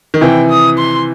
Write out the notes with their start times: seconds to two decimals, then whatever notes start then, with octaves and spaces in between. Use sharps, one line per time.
0.14 D#3
0.21 C3 E3 G5
0.50 D#6
0.78 C6